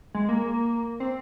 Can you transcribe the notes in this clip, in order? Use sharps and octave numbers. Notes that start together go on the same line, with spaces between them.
G#3
A#3
C4